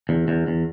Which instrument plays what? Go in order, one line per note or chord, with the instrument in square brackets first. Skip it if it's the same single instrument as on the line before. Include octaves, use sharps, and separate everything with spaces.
[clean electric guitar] E2
E2
E2